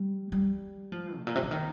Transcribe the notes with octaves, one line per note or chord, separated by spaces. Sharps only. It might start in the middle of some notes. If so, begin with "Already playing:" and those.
Already playing: G3
G3
F3
A2
A#2
C3
D3
D#3